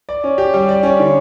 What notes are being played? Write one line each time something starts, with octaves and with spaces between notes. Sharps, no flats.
D5
C#4
G4
G3
D5
C#4
D3